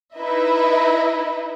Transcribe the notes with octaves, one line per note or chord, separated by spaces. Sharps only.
D#4 E4 B4 D#5 E5